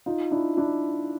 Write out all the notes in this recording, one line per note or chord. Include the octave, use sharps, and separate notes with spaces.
D#4 F4
D4 E4
D4 E4